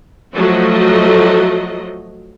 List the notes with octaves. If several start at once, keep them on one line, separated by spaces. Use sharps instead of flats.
F3 F#3 A3 F#4 D#5